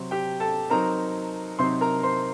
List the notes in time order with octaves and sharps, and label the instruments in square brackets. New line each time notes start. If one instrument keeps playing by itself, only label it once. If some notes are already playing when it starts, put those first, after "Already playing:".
Already playing: [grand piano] C3 F#3 C4
G4 G5
A4 A5
F#3 C4 D#4 A#4 A#5
C3 F#3 C4 D#4 C5 C6
A#4 A#5
C5 C6